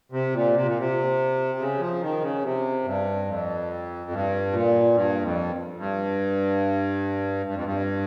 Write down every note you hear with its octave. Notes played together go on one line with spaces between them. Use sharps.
C3
A#2
C3
A#2
C3
C#3
F3
D#3
C#3
C3
G2
F2
G2
A#2
G2
F2
G2
G2
F2
G2